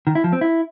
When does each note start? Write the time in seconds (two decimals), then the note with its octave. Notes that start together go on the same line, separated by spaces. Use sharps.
0.07 D#3
0.15 E4
0.24 F3
0.33 C4
0.41 E4